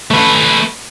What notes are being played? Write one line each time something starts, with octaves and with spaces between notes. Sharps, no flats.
A3 B4